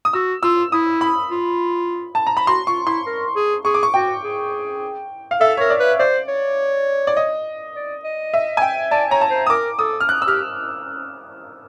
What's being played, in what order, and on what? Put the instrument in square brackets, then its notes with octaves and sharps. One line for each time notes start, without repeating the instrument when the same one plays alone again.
[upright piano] D#6
[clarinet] F#4 [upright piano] E6
[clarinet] F4 [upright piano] E6
[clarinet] E4 [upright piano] D#6
[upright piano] B5
[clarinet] F4
[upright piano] A5
A#5
B5
[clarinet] F#4 [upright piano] C6
[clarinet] F4 [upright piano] C#6
[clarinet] E4 [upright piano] C6
[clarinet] A#4
G#4
[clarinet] G#4 [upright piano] C#6
[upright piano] D6
C#6
[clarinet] F#4 [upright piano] G5
[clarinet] G#4
[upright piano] F5
[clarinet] A4 [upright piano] E5
[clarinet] A#4 [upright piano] C#5
[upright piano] D5
[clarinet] B4
[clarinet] C5 [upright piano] D5
[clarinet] C#5
[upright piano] D5
D#5
[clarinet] D5
D#5
[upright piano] E5
G#5
G5
[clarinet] D5 [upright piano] A5
[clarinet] C#5 [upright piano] A#5
[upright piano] A5
[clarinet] C5
[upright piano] D#6
[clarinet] A#4 [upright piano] D6
[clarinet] A4 [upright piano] D#6
[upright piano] F6
F#6
E6
[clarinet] G4 [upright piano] F6